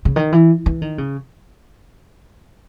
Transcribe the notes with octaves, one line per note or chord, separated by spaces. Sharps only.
C#3
D#3
E3
E3
D#3
C#3